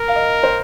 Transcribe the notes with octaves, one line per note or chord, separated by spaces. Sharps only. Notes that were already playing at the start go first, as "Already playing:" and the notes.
Already playing: A#4
F5
D#5
C5